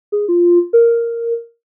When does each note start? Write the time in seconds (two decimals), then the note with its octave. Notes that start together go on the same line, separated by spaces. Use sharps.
0.12 G#4
0.28 F4
0.73 A#4